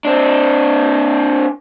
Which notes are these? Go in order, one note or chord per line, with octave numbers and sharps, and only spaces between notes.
C4 D4